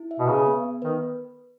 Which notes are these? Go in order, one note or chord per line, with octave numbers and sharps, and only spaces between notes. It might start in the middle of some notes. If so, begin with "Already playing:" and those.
Already playing: E4
E5
B2
C#3 B4
B3
B3
D#3 B4